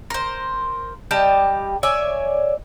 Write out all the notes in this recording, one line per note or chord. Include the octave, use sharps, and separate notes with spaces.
A#4 C5
G3 G4 D#5 A5
C#5 D5 E5 G#5